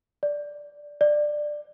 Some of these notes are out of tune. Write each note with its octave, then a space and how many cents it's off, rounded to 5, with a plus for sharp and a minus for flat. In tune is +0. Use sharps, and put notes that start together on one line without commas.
D5 -5
D5 +15